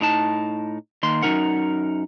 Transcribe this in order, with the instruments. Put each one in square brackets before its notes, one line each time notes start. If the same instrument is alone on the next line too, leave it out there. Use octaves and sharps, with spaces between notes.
[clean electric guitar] A2 D#4 A5
D#3 A#3 C6
F#2 A3 D#4 A#4 F#5